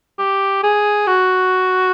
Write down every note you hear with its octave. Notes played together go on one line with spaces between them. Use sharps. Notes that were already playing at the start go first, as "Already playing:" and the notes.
G4
G#4
F#4